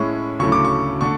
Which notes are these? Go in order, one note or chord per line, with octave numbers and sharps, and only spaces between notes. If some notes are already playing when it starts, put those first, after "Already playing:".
Already playing: A2 G#3 C#4 E4 C#6
D2 C#3 F#3 A3 E4 C#6
D6
C#6
D3 A3 C#6